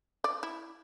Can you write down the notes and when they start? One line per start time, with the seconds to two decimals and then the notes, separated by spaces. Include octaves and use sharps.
0.24 D5
0.43 E4